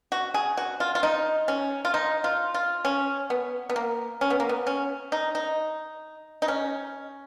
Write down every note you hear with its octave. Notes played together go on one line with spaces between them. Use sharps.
F#4
G#4
F#4
F4
F4
D#4
C#4
F4
D#4
F4
F4
C#4
B3
B3
A#3
C#4
B3
A#3
B3
C#4
D#4
D#4
D#4
C#4